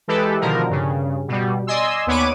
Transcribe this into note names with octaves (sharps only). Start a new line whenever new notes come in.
E3 G#3 G4 A4 B4
B2 D3 D#3 F3 A#4
G2 C#3
B2 G3
D5 D#5 G#5 C6 E6
D#2 B3 C#5 B5 D6 D#7